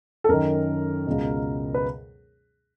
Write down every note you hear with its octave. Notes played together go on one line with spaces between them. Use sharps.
A4
F#2 D#3 A#4
C#2 B2
B4